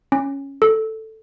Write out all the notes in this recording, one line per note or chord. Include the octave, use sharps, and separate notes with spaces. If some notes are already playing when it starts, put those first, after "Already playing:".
C#4
A4